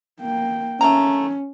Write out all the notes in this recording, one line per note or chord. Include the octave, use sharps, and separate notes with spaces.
A#3 G5
A3 A#3 C#4 A#5